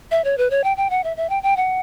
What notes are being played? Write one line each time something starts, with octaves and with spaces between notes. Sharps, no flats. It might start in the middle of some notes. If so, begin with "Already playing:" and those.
E5
C#5
B4
C#5
G5
G5
F#5
E5
E5
G5
G5
F#5